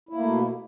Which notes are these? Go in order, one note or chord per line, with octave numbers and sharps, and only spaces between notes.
B2 A3 A#3 E4